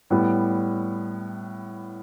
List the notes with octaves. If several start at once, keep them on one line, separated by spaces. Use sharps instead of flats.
A2 G3 B3